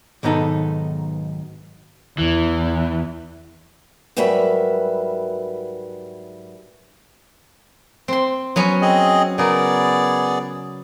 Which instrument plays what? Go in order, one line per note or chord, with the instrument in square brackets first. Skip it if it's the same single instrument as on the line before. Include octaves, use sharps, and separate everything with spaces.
[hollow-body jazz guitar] B1 G#2 D#3 B3 D#4 A4
[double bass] E2 [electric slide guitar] E3
[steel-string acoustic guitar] G#2 F#3 G3 A#4 B4 E5
[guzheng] C4 C6
F#3 B3 C#4
[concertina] C4 G#4 D#5
[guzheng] C#3 A#4 [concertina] B3 G#4 D5